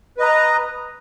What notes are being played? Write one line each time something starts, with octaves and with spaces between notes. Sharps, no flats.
B4 D#5 A#5